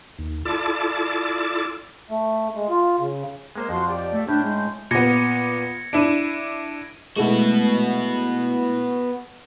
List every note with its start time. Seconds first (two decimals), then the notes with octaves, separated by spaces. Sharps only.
0.18 D#2
0.45 E4 F4 A4 D5 A5 D6
2.10 A3
2.55 G#3
2.70 F4
2.99 C#3
3.56 G#3 A#3 C5
3.69 F2 F3 F#4 C6
3.86 G4 D5
4.12 A3
4.28 A2 C#4 D4 G6
4.44 G#3
4.91 A#2 B3 G#6 A#6 C#7
5.93 D4 E4 D7 D#7
7.17 G#3 A3 B3 E4 F#4